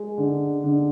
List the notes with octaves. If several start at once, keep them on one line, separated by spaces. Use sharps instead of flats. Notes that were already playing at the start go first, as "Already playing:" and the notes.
Already playing: G#3
D3
D3